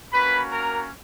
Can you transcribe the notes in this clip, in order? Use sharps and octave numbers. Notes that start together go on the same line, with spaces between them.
A#3 C#4 F#4 B4 B5
A#4 A#5